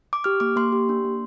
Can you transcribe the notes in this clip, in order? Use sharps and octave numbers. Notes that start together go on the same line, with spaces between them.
D6
G4 F6
A#3 D6
A#3 C6
G4
D4
A#3